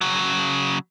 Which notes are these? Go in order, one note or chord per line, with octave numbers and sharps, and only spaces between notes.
C#3 F#3